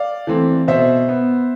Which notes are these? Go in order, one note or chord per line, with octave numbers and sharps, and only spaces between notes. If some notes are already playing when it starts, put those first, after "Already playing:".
Already playing: D5 F5
E3 A3 C4
B2 C5 E5
B3